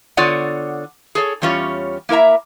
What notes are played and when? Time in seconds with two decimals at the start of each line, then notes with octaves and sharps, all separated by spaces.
0.17 D3 B3 F4 C#5 D5 F#5
1.15 G#4 A4 C#5
1.42 E2 G3 C#4 F4 C#5
2.09 A#3 E4 A#4 E5 A#5